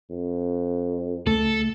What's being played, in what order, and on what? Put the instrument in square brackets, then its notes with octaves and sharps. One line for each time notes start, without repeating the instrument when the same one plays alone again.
[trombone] F2
[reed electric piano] C#2 A3 [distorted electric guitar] A4